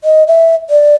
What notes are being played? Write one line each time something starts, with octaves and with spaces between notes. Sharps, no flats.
D#5
E5
D5